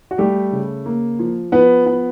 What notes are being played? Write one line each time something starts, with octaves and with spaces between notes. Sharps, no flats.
F#4
G3 A3 G4
C#3
A#3
F3
F3 B3 B4
B3